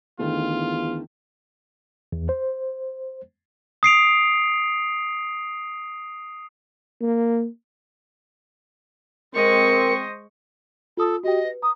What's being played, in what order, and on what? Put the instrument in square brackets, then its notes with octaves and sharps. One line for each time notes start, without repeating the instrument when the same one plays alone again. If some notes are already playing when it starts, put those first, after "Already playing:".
[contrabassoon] E2 [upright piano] D3 D#3 A3 [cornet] F4
[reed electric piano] E2
C5
[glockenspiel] D#6 C7 D7 F7
[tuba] A#3
[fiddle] G#3 C#6 [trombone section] C4 [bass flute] A#4 [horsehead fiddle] C5 D#5
[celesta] F4 D#6 [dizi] A4
[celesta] F#4 G4 G5 [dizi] D#5
[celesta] B4
[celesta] A#5 [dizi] D#6